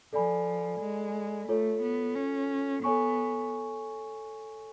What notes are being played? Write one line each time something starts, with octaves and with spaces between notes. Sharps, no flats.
F3 A4 D5 G#5 B5
G#3
A3 F4 A4 C#5
B3
C#4
B3 A4 C#5 G#5 C#6